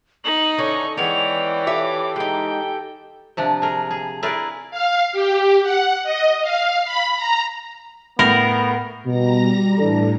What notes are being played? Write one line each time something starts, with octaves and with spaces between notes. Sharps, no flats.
D#4 F#7
D3 E3 C#4 A4 C#6
E3 G#3 B3 C#4 C#5 D5 G5 F7
F4 G4 A4 C#5 E5 D6
G#3 D#4 G5
C3 F3 D4
G#4 A#4
G#4
E4 G#4 A#4 B4 D5
F5
G4
F#5
D#5
F5
B5
A#5
A2 B3 A#4 A#6 F#7
B2 G3 A#5 A#6
A2 E3 D4 A4